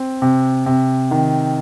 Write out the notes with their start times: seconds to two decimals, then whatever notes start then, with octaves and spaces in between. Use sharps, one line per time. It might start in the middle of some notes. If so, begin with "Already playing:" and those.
Already playing: C4
0.22 C3
0.66 C3
1.11 D#3